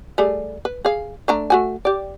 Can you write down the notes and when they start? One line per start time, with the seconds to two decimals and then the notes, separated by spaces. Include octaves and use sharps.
0.18 G3 A3 G#4
0.65 B4
0.85 G#4 F5
1.28 A3 D4 A#5
1.50 A3 F#4 G#5
1.85 G4 D5